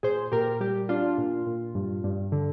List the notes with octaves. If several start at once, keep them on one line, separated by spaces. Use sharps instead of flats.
A#2 G#4 C5
A#2 G4 A#4
G3 G4
D4 F4
A#2
A#2
G2
G2
D3